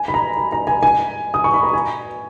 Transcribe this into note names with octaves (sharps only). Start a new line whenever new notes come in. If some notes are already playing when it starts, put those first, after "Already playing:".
Already playing: G#5
B5
A#5
B5
A#5
G#5
G#5
D#6
C#6
B5
A#5
G#5